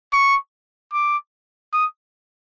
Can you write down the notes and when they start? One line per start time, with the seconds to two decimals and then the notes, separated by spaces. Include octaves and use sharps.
0.13 C#6
0.93 D6
1.73 D#6